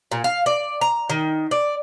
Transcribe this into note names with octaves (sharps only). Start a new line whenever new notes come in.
A#2
F5
D5
A#5
D#3
D5